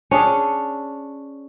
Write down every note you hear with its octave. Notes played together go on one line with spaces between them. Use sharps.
C#4 D4 G#4